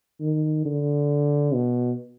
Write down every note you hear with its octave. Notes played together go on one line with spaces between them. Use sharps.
D#3
D3
B2